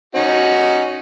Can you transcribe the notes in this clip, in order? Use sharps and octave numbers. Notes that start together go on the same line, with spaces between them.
C#4 D#4 F#4